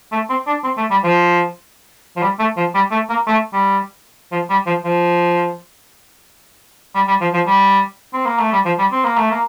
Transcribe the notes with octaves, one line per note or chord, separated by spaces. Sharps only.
A3
C4
D4
C4
A3
G3
F3
F3
G3
A3
F3
G3
A3
A#3
A3
G3
F3
G3
F3
F3
G3
G3
F3
F3
G3
C4
A#3
A3
G3
F3
G3
C4
A#3
A3
A#3